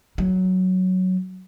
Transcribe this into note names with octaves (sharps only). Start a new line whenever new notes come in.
F#3